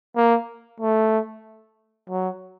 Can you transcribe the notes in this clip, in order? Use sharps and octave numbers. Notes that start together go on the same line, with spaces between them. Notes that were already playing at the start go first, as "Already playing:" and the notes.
A#3
A3
F#3